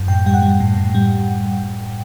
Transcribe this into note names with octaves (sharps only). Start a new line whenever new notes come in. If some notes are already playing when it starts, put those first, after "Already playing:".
Already playing: F#2
A2 G5
G3 G5
F#5
G3
A2
A2
G3